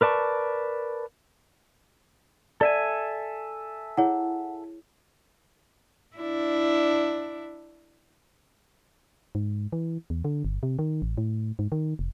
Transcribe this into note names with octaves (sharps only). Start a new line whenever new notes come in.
A#4 B4 D5 A5 C#6
A4 D5 E5 G#5
E4 G#4 C#5 F#5
D4 E4
G#2
E3
E2
D3
G1
C3
D#3
A1
A2
G#2
D#3
F1